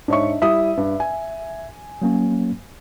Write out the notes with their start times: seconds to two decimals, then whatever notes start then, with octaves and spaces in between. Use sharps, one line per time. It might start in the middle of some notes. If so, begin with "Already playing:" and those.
0.08 G#2 D4 C#5 D#5 E5 C#6
0.42 G3 E4 E5 D#6
0.77 G2
1.00 G#5
2.02 F#3 A#3 C#4